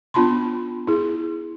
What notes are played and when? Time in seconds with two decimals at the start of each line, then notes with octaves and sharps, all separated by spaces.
0.14 B3 D4 F4 A5 B5 C6
0.87 E4 G#4